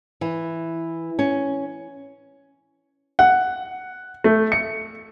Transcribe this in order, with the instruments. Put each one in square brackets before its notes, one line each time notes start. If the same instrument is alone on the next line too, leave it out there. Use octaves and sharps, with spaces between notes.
[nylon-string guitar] E3
C#4
[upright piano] F#5
A3
C#7